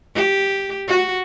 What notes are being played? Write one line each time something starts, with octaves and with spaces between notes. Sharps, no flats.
G4
F#4